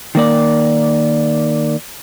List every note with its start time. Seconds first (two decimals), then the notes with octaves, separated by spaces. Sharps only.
0.15 D#3 A#3 D5